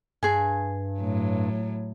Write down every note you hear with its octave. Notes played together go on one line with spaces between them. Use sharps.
G2 G#4 G#5
A2 F#3